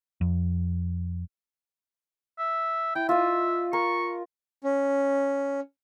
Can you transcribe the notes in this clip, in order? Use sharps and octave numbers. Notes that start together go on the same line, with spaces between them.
F2
E5
E4 G5
F4 D#5 E5
A#4 C#6
C#4